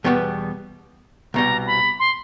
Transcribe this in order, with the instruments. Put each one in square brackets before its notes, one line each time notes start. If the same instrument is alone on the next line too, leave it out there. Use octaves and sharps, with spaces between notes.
[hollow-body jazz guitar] E2 B2 G3 B3
[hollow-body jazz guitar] C2 B2 G3 [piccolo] A#5
[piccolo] B5
C6